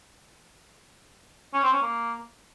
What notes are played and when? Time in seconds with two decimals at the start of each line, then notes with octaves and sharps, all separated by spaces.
1.54 C#4
1.63 C4
1.72 C#4
1.82 A#3